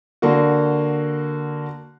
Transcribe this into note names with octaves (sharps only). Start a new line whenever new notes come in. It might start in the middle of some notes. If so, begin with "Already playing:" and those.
D3 A#3 F#4